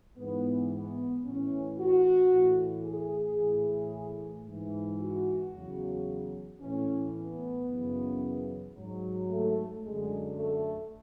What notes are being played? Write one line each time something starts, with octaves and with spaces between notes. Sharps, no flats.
G#2 E3 B3
B3
A2 E3 C#4
F#4
A2 E3
G#4
A2 E3
G#2 E3
F#4
E2 C#3 F#3
A2 E3 C#4
B3
F#2 C#3 E3
G#2 F#3
A3
F#2 D3 F#3 G#3
A3